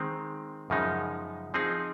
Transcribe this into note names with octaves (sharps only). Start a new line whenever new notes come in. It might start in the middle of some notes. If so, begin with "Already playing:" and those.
Already playing: D#3 G#3 C4
F#2 C#3 F3 G#3 D#4
F3 C4 D#4 G#4